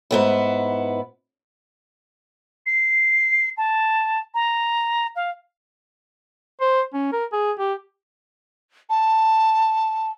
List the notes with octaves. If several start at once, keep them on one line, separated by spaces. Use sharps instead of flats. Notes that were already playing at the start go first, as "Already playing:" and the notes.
G#2 B3 E4
C7
A5
A#5
F5
C5
C#4
A#4
G#4
G4
A5